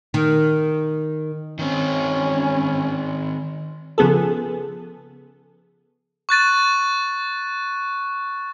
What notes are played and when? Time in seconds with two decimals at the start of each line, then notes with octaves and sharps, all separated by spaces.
0.14 D#3
1.59 D#3 C4 C#4
3.98 C#3 F3 B3 G#4 A4
6.29 C#6 F#6 A6 D#7